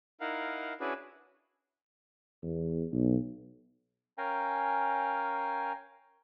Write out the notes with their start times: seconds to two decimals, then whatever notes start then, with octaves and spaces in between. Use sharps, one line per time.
0.20 D#4 E4 A#4 F5 F#5
0.80 C#4 D4 E4 F#4 G#4 B4
2.43 E2
2.92 B1
4.18 C#4 A#4 F5 G5 G#5 A#5